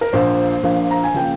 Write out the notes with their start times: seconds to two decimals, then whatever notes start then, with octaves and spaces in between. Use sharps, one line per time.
0.01 A#4
0.13 A#1 A#2 F3 A#3 C5
0.63 A#1 A#2 F3 A#3
0.91 A#5
1.04 G#5
1.14 C#3 F3 A#3 G5